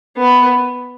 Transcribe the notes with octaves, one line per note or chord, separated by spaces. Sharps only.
B3